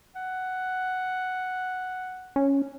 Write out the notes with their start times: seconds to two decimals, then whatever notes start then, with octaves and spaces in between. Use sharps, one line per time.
0.16 F#5
2.36 C#4